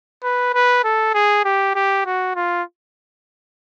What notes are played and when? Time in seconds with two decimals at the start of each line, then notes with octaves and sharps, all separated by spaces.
0.23 B4
0.54 B4
0.84 A4
1.14 G#4
1.45 G4
1.75 G4
2.06 F#4
2.36 F4